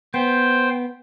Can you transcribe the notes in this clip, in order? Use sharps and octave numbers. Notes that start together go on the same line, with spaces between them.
B3 C5 G5